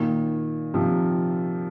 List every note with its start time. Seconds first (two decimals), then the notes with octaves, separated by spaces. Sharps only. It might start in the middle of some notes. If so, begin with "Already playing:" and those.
Already playing: A#2 D#3
0.74 C3 F3